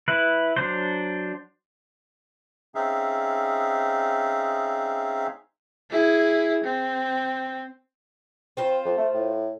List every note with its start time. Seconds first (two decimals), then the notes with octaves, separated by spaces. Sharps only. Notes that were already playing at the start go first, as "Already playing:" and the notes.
0.08 E4 B4
0.56 F#3 D4 C5
2.75 C4 C#4 D#4 G#4 E5 F5
5.90 E4 G#4
6.64 C4
8.57 C4 F4 C5
8.85 F2
8.97 A3
9.14 A2